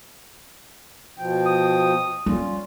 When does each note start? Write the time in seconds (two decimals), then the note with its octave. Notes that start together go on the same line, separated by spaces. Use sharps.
1.18 B2 F3 G5
1.46 D#6
2.26 G3 C#4 F4